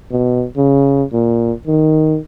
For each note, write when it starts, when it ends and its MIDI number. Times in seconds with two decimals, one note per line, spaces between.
0.11 0.45 47
0.57 1.03 49
1.13 1.53 46
1.67 2.18 51